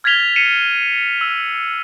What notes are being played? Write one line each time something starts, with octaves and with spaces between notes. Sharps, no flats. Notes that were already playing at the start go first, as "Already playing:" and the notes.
F6 G#6 A6 B6 F7 G7
C7 C#7 D#7 E7
E6